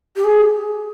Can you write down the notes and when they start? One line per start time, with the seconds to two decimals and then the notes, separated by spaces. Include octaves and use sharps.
0.16 G4
0.24 G#4